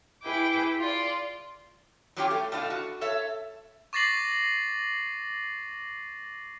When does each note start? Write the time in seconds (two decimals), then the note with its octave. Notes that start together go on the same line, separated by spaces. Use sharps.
0.23 E4 G#4 B4 G5 D6
0.80 F4 D5
2.17 F#3 G3 C#4 F4 G4 G5
2.31 A3
2.52 B2 A3 D4 F4
2.70 F#4
3.01 A4 C#5 E5
3.93 C#6 D6 A6 A#6 C7 F#7